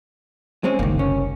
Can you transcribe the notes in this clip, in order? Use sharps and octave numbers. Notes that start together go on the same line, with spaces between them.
G#3 C4 C#4
F#1 C2 D#3 A#3
C#4